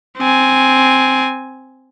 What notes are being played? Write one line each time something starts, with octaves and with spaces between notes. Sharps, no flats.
C4 G#5